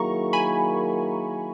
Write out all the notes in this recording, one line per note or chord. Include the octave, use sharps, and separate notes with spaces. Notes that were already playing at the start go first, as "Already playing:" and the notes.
Already playing: D#3 F#3 A#3 E4 G#4 A#5 C#6
G#5 B5